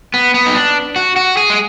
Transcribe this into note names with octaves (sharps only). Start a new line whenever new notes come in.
B3
B3
D#4
D4
F#4
F#4
G#4
G#3